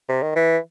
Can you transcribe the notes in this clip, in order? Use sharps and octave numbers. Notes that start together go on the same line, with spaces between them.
C3
D#3
E3